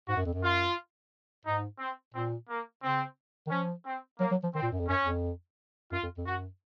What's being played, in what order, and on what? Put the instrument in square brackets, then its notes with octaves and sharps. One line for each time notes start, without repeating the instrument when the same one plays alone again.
[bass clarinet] G#2 [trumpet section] F#4
[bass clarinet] F#2
F2
F#2
[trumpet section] F4
[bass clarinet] G#2 [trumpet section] D#4
[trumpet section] C4
[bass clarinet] A#2 [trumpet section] C4
[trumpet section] A#3
[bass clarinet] C#3 [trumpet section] C4
[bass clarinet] D#3
[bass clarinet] F3 [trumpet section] C#4
[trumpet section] C4
[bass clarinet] F#3 [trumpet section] A#3
[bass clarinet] F#3
F3
[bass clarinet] D#3 [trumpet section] C4
[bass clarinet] A#2
F#2
F2
[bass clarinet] F#2 [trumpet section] C#4
[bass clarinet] F2
[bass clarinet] F#2 [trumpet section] F4
[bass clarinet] F2
F2
[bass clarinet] F#2 [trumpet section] F#4